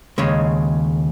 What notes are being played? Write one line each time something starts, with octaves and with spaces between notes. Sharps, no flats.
D#2 C#3 G#3